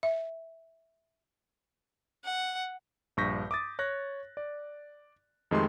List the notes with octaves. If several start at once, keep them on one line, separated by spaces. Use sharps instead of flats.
E5
F#5
A#1 G2 C#6 G6 A#6 B6
D6 D#6 A6
C#5 F#6 A#6
D5
F2 D#3 G#3 A3 G4 C6